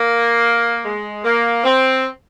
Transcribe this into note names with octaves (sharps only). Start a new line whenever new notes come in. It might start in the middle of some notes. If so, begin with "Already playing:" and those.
Already playing: A#3
G#3
A#3
C4